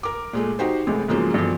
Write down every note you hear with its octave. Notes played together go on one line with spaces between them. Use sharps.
A#4 D6
A#2 G#3 A3
D#4 F#4 G4 C5
A1 A2 C3 G#3
G#2 C#3 F3 F#3 G#3 A#3
G2 B2 D3 E3 F3